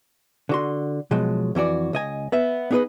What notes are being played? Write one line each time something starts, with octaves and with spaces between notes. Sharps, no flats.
D3 F#4 C6
B2 F3 F#3 G#3
F2 E3 F#4 D5
C#2 D#5 G#5
B3 B4 E5
B3 D#4 G#4 A#4 B4 D#5